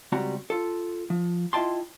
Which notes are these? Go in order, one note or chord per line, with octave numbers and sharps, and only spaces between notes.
C#2 G3 C4 F#4 A#5
F4 A4
F3
E4 F4 D#5 G5 A5 C6